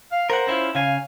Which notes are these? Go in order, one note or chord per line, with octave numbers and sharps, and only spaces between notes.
F5
A#4 C5 F#5
C#4 E4 F4
C#3 F5 G#5